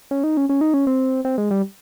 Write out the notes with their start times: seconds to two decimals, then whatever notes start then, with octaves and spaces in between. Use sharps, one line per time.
0.11 C#4
0.24 D#4
0.37 C#4
0.49 C#4
0.61 D#4
0.74 C#4
0.87 C4
1.25 C4
1.38 G#3
1.51 G3